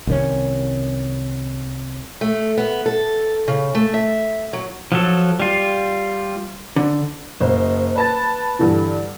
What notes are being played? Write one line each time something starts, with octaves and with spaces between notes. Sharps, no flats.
C2 D#3 C#4
A3
B3
A4
C#3
A3
E5
F#3
F3 F#3 A4
G3 F4
D3
F#1 C5 D#5
B4 A5 A6
G2 D3 E3